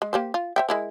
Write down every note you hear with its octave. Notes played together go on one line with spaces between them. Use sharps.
G#3
A#3 G4 C5
F4
C5 E5 G5
G#3 E4 A#4